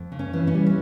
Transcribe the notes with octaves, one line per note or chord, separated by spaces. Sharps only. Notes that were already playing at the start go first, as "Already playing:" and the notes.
Already playing: F2
C#3
C#4
E3
C#4
G3
C#4